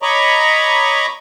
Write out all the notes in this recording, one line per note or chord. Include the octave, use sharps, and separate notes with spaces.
C#5 D#5 A#5 B5 C#6 D6